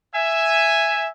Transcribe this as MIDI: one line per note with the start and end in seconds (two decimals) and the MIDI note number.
0.14 1.07 76
0.14 1.07 80